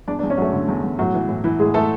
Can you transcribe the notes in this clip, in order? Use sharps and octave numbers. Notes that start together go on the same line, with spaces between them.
E2 D4 D5
D4 D5
E2
C#4 C#5
F#3 A3 A4
D3
E2
E2
A2 F#3 F#4
E3
A2
E3 E4
A2 G#3 G#4
E3 A3 A4